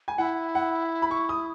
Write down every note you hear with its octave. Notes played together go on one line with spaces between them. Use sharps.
G#5
E4 F#5
F#5
B5
C#6
D#6